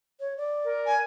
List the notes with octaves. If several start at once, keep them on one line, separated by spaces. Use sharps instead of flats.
C#5
D5
A#4
G#5